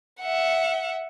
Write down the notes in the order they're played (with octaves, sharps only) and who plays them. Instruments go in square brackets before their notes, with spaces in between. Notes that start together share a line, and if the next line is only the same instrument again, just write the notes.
[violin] E5 F#5